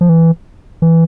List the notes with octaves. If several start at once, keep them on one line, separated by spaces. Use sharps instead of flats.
F3
E3
E3